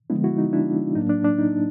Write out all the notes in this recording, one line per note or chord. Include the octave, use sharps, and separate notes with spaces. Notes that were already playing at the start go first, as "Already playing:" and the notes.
D3 F3 G#3 B3 D4 E4
E4 F#4
D#4
D4 E4
A2 F#3 A#3 D4 D#4
D4
D4
D#4